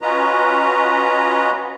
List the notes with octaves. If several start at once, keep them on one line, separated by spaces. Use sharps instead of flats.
C#4 F4 F#4 B4 D#5 A#5